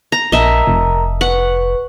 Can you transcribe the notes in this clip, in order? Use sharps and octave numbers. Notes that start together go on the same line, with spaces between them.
A#5
A#1 A#4 D#5 E5 A5 A#5
F1
B4 F#5 C#6